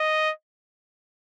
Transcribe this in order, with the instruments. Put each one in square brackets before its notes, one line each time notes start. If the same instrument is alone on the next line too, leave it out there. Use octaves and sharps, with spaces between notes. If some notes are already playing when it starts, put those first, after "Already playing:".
Already playing: [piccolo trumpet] D#5